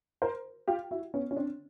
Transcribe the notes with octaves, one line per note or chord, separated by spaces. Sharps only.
A#4 C5
F4 G4
E4 F#4
B3 C#4
C#4
C4 D4